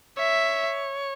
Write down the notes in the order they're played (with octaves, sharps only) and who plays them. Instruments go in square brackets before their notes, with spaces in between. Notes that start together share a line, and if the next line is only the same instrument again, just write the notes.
[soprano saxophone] C#5 [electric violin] E5